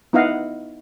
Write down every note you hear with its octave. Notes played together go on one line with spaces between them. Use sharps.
B3 D#4 E4 D#5 F5 F#5